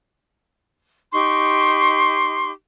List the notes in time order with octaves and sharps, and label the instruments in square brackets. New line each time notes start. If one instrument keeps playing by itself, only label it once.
[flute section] D#4 G4 C6 C#6